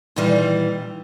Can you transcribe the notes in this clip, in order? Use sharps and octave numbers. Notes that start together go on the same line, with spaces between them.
A#2 D#3 E3 G3